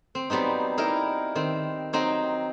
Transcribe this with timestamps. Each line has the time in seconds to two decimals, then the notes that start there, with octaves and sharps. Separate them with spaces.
0.15 C4
0.30 F#3 G3 B3 C4 D#4
0.77 A#3 D#4 E4 A#4
1.35 D#3 C4
1.93 F#3 C4 D#4 D#5